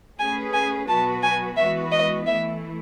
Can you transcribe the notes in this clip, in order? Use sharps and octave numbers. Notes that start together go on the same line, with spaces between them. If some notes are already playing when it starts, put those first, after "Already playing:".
A3 C#4 G#4 B4 G#5
G#5
B2 F#3 B3 F#4 B4 A5
G#5
E3 G#3 B3 F#4 B4 E5
D#5
E3 A3 E4 E5